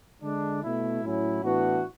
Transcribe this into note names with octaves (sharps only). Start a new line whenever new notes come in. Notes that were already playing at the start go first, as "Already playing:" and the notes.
D3 G#3 D4
B2 A3 E4
A2 F#3 C#4 E4
A2 E3 B3 D4 F#4